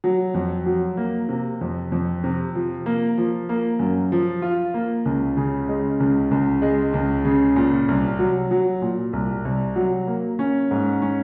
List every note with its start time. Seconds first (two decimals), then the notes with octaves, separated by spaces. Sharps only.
0.04 F#3
0.34 F2
0.66 F#3
0.97 A#3
1.29 C3
1.61 F2
1.92 F2
2.24 C3
2.55 F3
2.86 A#3
3.18 F3
3.49 A#3
3.79 F#2
4.12 F3
4.42 F4
4.74 A#3
5.06 C#2
5.37 C#3
5.69 G#3
6.00 C#2
6.31 C#2
6.62 G#3
6.94 C#2
7.25 C#3
7.56 A#2
7.88 C2
8.19 F#3
8.51 F#3
8.82 A#2
9.13 C2
9.45 C2
9.76 F#3
10.07 A#3
10.39 C#4
10.71 G#2
11.02 C#4